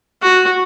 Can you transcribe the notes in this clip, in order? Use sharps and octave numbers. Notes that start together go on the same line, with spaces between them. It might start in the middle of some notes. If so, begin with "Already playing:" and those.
F#4